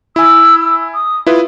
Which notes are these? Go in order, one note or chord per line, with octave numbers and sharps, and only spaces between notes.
E4 G#5 E6
D#6
E4 F4 B4 D#6